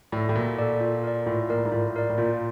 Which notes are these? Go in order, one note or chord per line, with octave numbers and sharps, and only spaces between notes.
A2 A4 D5
A2
A#2 F#4
A4 D5
F4
A#4 D5
A2 F4
A#2 A#4 D5
A2
G#2
A2 F4
A#4 D5
A2
A#2 F4